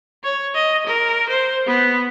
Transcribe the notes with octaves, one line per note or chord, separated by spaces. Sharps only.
C#5
D#5
A#4
C5
B3